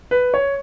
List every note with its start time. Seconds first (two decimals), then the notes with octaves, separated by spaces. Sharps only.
0.11 B4
0.34 C#5